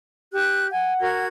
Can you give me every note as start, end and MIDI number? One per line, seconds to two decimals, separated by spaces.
0.33 0.68 67
0.33 0.68 90
0.72 1.26 78
0.72 0.94 80
1.00 1.28 66
1.00 1.28 70
1.00 1.28 92